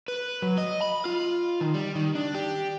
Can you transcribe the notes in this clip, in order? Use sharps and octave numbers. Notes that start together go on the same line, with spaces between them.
B4
F#3
D#5
B5
F4
D#3
G3
D#3
D4
G4